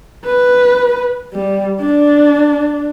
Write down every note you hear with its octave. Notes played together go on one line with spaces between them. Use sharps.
B4
G3
D4